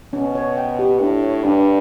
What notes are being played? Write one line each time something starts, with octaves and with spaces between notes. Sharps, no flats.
B2 C#4
C#5
G5
G4
A2 D4
C#5
G2 D4